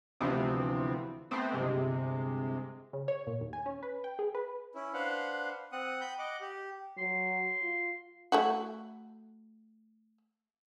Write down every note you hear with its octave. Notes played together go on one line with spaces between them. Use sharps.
D2 C3 E3 F3 B3 C4
A3 B3 C4 C5
G1 C3 G#3
C#3
C#5
A#2
D#2
G#5
C#4
B4
G5
G#4
B4
C#4 E4
D4 B4 C5 F5 F#5
C4 F#5 D#6
B5 G6
D#5 F#5 D6
G4
F#3 C6
F4
A3 E4 F#4